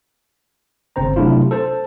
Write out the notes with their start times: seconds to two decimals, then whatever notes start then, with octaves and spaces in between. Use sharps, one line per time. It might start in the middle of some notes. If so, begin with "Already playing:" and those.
0.96 G1 C#3 C4 C5 A#5
1.16 C3 F#3 A3 D4 E4 F4
1.51 A4 C5 A5